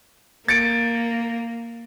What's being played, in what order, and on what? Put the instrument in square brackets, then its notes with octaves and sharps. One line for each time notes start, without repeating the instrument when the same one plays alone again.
[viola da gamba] A#3 [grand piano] A6 C#7 D7